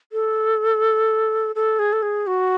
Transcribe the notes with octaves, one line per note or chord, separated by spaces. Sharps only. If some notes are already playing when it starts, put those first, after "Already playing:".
A4
A4
G#4
A4
G#4
F#4